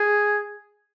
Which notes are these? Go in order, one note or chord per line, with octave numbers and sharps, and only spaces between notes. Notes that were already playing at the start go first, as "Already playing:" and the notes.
Already playing: G#4